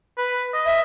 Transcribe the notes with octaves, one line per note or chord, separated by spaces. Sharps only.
B4
D#5
E5